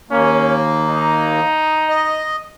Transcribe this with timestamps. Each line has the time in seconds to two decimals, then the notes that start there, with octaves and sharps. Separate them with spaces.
0.11 D#2 A#3 C#4
0.88 D#4
1.89 D#5